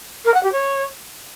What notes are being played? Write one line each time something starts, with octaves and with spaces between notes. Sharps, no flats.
A#4
F#5
G4
C#5